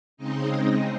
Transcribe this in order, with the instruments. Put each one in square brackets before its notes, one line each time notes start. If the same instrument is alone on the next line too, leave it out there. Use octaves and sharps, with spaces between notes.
[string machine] C#3 G#3 C4 D#4 D#5